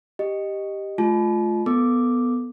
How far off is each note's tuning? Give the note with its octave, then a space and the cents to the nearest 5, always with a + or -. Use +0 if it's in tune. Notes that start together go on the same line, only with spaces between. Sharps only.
G4 +0 D#5 -5
A3 -35 F4 +0 A5 -35
B3 +0 A4 +10 D6 +0